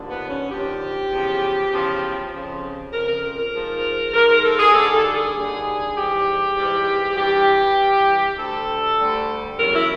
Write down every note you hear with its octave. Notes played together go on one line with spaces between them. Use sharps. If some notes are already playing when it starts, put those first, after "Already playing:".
Already playing: D#2 D3 F3
B3
C#4
D#2 D3 F3 G4
E2 C#3 F3
E2 C#3 F3
F2 C#3 F3
F2 C#3 F3 A#4
A#4
A#4
A#4
G#2 F3
G#2 F3 A#4
A#4
A4
G#4
D#2 D3 G3 A4
A4
G#4
D#2 D3 G3
G#2 E3 G3 G4
G#2 E3 G3
G2 E3 G3 G4
G2 E3 G3
D2 D3 G3 A4
D2 D3 G3
E2 C#3 F#3 A#4
E4